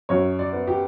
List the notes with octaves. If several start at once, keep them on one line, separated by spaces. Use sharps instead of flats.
F#2 C#5
D5
B3
G4